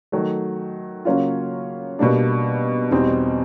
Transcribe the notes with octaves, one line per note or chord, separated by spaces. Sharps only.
D#3 F#3 A3
C#3 F#3 A#3 C#4 F4
B2 G3 A#3 D4
E2 B2 G3 C4 D#4